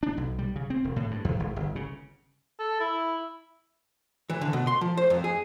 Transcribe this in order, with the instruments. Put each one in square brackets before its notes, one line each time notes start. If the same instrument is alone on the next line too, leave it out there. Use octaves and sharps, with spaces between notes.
[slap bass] D4
B1
G3
C#3
C4
E1
A2
G2
E2
G#1
G1
C#3
[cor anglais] A4
E4
[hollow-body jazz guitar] E3
D3
B2
C6
F3
C5
F2
G#4